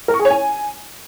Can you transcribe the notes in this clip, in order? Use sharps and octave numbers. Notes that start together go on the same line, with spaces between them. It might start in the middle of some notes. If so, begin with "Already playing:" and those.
A#4
C#6
G#4
C#5
G#5